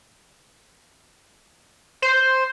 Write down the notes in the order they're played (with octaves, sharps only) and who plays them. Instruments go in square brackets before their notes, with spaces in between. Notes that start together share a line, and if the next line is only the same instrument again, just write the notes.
[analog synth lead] C5